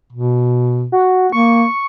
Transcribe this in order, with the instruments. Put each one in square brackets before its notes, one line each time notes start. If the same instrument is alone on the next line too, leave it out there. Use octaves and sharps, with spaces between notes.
[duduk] B2
[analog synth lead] F#4
[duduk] A#3 [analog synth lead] C#6